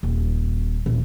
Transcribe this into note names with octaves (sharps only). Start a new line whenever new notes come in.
D#1
D#1